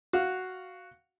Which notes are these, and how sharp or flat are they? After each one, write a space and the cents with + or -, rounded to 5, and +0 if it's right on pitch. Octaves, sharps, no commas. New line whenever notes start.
F#4 +0 F5 +0